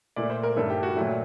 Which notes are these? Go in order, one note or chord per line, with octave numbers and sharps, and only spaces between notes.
A#2 A3 D5
C5
A#4
G2 D#3 A3 A4
G4
F#4
A#2 F#3 A3